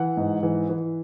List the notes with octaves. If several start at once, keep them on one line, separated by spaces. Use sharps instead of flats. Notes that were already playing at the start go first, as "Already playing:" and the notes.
Already playing: E3 F#5
G#2
E3
E3